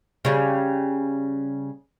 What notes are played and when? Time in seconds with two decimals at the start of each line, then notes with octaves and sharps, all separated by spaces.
0.25 C#3 G3